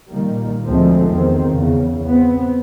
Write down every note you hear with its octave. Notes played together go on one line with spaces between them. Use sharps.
A#2 D#3 G3 A#3
D2 D3 F3 G#3 A3 C4
E2 D#3 C4
E2 C#3
B3 C4